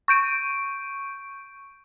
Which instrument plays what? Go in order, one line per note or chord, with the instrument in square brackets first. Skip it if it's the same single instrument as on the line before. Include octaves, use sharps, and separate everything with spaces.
[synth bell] C#6 G6 D7 D#7